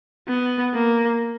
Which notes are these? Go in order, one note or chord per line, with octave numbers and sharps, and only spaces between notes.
B3
A#3